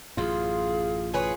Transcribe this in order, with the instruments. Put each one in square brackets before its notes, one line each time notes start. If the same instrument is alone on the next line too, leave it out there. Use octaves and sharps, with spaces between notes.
[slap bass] A1 F#2 [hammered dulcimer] F4 [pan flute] G#4
[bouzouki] G#4 B4 C#5